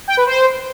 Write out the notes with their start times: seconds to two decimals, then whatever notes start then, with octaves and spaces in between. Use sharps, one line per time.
0.08 G5
0.17 B4
0.27 C5